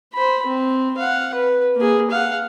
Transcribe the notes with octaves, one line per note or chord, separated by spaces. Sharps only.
C5 B5
C4
F5 F#5
B4
A#3 G#4
F5 F#5